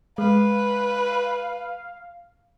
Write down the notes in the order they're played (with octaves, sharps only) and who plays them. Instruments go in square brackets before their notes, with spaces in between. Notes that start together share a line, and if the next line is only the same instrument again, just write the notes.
[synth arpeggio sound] G#3 [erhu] B4 [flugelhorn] F5